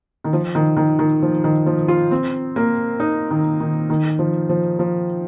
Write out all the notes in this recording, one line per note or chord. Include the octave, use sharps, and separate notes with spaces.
D#3
F3
D#3
D#3
D#3
F3
D#3
F3
F4
C4
A#3
D#4
D#3
D#3
D#3
F3
F3
F3